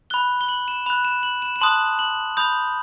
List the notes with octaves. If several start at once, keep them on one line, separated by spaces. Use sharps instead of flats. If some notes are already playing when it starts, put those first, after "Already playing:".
B5 F#6 G7
G7
F#7
E7
B5 F#6
E7
F#7
E7
E7
A5 C6 D#6 F#6 F#7
F#7
B5 D#6 G6